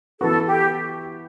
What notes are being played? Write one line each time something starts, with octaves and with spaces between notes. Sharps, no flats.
E3 B3 F#4 A4
G4